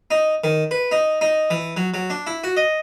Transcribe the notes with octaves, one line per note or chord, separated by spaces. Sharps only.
D#4
D#3
B4
D#4
D#4
E3
F#3
F#3
D4
E4
F#4
D#5